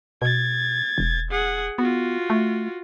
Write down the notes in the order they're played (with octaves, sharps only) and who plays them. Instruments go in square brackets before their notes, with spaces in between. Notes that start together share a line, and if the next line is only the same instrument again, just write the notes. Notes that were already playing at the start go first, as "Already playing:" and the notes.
[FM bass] B2 [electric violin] G#6 A6
[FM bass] E1
[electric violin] G#4 F#5
[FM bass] B3 [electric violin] F4 F#4
[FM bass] A3